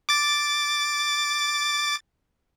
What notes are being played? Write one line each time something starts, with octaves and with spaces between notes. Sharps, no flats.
D6 A6